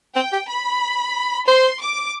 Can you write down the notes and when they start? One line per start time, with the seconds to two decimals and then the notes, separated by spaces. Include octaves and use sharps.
0.16 C4 G5
0.32 G4
0.49 B5
1.47 C5 C6
1.80 D6